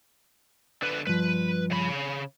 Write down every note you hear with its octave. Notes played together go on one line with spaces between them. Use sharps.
D3 B4
G2 F3 B4
C#3 B5